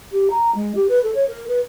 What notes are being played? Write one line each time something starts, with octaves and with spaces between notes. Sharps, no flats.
G4
A#5
G#3
G4
B4
A4
C#5
A#4
B4